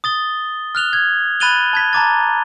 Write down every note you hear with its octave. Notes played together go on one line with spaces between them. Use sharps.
D#6 A6 G7
F6 F#6 F7 G7
G#6
B5 F#6 A6 D#7 F7 G7
A5 G#6 B6
A5 A#5 D6 A6